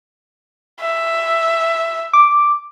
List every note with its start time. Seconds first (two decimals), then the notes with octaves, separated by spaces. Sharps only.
0.81 E5
2.13 D6